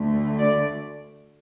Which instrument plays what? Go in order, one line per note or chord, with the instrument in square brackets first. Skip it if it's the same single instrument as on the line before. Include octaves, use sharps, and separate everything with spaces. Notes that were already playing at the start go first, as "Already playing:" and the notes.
Already playing: [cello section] D2 D3 A3
D5